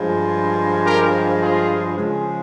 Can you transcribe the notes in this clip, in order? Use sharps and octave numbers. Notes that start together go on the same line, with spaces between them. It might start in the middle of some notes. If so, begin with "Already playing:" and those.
Already playing: G2 F3 G#3
G4 A#4
F4 G#4
C#3 F3 G#3